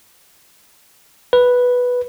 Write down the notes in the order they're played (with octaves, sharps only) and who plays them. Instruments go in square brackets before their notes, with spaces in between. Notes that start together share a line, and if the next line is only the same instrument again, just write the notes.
[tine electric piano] B4